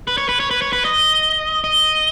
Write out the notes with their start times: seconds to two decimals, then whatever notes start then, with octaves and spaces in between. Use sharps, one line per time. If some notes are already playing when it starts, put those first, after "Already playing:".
0.07 B4
0.18 C#5
0.29 B4
0.40 C#5
0.51 B4
0.62 C#5
0.73 B4
0.85 D#5
1.64 D#5